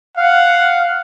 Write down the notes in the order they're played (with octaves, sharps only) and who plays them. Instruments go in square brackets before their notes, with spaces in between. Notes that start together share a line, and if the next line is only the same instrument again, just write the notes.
[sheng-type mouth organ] F5 [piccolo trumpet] F#5